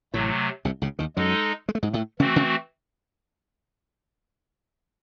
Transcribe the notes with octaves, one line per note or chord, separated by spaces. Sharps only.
A1 A2 C3 F#3 A3
C2 C3
C#2 C#3
D#2 D#3
F#2 F#3 G#3 D#4 A4 D#5
G#3
A3
G#2 G#3
A2 A3
C#3 E3 A3 C4 C#4 F#4
C#3 C#4